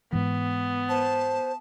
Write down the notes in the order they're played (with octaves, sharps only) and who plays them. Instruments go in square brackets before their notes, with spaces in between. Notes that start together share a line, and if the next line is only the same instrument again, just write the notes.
[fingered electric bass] G#2 E3 [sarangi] B3
[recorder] C5 [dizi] A5